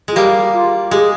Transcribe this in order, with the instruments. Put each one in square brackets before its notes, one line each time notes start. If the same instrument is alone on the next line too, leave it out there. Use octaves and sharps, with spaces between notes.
[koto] G#3 [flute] F4
[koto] G3 A#3 [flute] G4
[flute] F4
[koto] G#3 [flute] G4
[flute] G#4